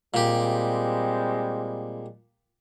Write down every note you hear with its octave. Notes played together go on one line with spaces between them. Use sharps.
A#2 G3 G#3 C4 G4